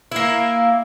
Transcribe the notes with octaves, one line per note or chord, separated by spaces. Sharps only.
A#3 E4